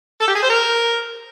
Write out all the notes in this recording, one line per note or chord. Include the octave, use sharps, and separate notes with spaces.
A4
G4
G#4
C5
A#4